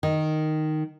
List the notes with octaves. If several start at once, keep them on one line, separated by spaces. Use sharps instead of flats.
D#3